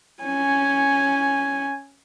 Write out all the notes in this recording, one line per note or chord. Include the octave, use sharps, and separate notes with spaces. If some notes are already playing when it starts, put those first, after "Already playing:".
C#4 G#5